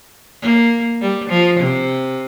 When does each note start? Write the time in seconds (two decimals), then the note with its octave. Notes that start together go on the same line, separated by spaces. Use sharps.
0.42 A#3
1.01 G3
1.30 F3
1.60 C3